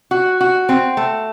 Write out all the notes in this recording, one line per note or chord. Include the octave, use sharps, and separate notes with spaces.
F#4
F#4
C4
A3